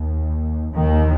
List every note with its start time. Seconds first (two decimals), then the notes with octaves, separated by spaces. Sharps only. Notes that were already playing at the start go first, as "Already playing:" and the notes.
Already playing: D#2
0.75 D#2 D#3